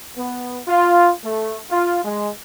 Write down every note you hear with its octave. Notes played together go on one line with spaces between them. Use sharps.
B3
F4
A3
F4
G#3